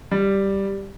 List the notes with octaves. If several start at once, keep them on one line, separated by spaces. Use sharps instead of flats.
G3